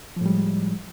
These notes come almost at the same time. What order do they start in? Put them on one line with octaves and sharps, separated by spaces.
F3 A2 G3 G#3